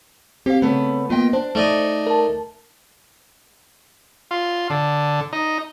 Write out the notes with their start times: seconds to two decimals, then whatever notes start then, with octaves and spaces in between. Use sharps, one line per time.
0.46 C4 G4 F5
0.62 C#3 A3 B3
1.10 A#3 B3 F4 D#5 G5
1.33 D4 C5
1.55 A3 D#4 D5 D#5
2.07 A#4 A5
4.31 F4
4.70 D3
5.33 D#4